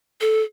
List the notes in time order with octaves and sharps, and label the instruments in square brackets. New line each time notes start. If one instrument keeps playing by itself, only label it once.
[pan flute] A4